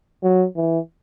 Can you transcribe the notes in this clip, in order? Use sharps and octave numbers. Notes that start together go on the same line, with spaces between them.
F#3
E3